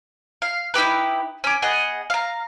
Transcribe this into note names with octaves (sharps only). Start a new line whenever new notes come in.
F5
D#4 E4 G4 B4
C#4 D6
B3 G#4 D#5 F#5
F5 A#5